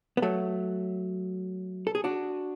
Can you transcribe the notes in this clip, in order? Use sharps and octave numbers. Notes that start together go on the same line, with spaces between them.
B3
F#3 A3
A4
G#4
D4 F#4